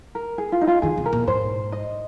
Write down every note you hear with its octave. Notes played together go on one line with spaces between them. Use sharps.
A#4
G#4
F4
D#4
F4
D#3 G#4
C3
A#4
A#2
G#2 C5
D#5